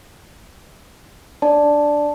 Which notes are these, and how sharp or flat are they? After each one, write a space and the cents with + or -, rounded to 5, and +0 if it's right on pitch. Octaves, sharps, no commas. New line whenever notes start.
D4 +0 D5 +0 A5 +0